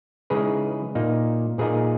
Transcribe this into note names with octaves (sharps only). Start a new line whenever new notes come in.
C#3 E3 G#3 D#4 G#4 B4
A#2 A#3 D#4
A#2 A#3 D#4 G#4 B4